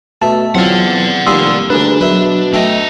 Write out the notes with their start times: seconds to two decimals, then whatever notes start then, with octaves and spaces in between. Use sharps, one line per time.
0.22 B2 A3 E5 A5
0.55 E2 F#3 C4 F4 D5 F#5
1.27 F1 G3 A#3 G#5 C6 D#6 E6
1.70 D2 D4 G#4 A#4 B4
2.01 B2 F#3 B4 E5
2.53 A3 D4 D#5 E5 G5